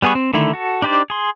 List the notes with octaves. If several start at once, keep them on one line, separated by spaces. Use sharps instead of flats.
G3 B3 G#4 B4 C#6
C4
D3 D#3 A3 E4
F#4 A4
D4 D#4 G4 C5 D5
G#4 C6